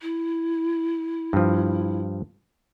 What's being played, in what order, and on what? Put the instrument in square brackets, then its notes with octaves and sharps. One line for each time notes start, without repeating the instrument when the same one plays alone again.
[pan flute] E4
[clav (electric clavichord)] G2 F3